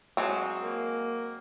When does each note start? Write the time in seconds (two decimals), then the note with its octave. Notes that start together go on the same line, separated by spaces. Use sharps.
0.17 F#3 G#3 C4
0.61 A#3